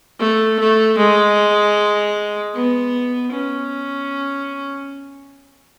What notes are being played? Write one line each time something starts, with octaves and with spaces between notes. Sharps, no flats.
A3
A3
G#3
B3
C#4